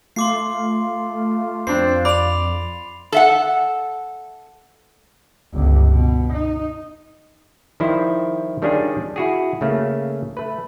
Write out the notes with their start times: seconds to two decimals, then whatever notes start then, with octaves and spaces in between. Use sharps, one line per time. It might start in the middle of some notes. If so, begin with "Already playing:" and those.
0.16 A3 F4 C6 D6 C7
1.67 F2 C4 D4 C7
2.05 D5 B5 F7
3.12 A4 E5 F#5
5.53 G1 C#2
5.91 B2
6.33 D#4
7.80 D#3 F3 G3 E4 C5
8.62 D#3 G3 C#4 D4 F4 G#4
9.16 E4 F#4 G#4
9.61 C#3 A3 A#3
10.37 A3 B4